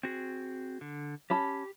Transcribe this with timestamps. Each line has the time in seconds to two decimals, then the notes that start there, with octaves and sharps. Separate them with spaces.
0.03 C4 F#4 G#4
0.81 D3
1.30 C#4 G4 A5 B5